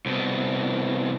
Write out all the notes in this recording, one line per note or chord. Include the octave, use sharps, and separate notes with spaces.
C2 B2